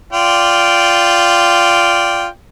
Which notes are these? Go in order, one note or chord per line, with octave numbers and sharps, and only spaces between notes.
F4 D5 G5